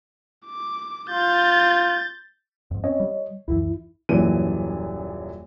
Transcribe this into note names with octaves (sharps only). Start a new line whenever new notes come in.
D6
F4 G6 A6
F2 G#2
C4 C#4 C#5 D#5
G3
C#2 F#2 E3 E4
D#1 F#2 A#2 E3 D#7